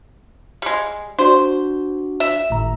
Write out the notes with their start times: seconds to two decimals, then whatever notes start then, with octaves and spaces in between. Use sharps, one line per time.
0.62 G3 G#3
1.19 D4 F#4 C5 D5
2.20 E5
2.50 G#1 A2 A#5